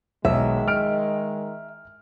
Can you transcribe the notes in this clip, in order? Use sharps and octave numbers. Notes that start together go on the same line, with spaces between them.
B1 D#3 G#3 E5
F6 D7